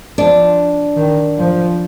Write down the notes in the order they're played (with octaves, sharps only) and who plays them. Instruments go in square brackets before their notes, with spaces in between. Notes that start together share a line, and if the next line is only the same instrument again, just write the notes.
[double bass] F3 [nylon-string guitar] D4
[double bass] D#3
F3